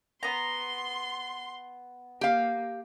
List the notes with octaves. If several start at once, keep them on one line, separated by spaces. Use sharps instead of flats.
B3 A#5 C6
A#3 G4 F5